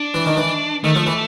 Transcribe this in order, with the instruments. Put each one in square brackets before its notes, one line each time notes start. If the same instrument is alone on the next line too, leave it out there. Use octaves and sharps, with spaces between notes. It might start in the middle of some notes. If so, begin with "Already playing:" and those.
Already playing: [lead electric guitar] D4
[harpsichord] E3
D#3
E3
[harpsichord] D#3 [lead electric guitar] A3
[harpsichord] F3
E3